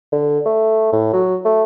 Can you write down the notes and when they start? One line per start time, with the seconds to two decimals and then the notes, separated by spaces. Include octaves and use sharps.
0.12 D3
0.45 A3
0.93 A2
1.13 F#3
1.45 A3